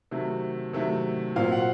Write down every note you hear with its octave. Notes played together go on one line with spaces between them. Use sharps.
C3 D#3 F#3 A3
C3 D#3 F#3 A3
A#2 F#3 C4 F5
F#5